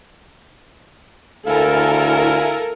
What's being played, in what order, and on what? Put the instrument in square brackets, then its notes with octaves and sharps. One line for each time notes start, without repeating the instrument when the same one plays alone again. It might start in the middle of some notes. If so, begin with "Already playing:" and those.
[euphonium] D2 [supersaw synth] E4 G#5 [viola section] A4 A#4 [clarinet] F5